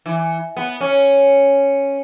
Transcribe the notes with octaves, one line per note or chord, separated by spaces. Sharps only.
E3
B3
C#4